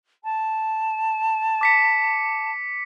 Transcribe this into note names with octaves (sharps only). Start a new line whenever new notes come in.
A5
D6 B6 C#7